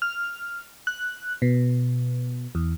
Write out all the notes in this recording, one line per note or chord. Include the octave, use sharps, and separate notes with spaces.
F6
F#6
B2
E2